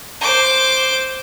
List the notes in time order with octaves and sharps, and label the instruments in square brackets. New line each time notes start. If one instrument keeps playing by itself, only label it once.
[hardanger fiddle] C5 D6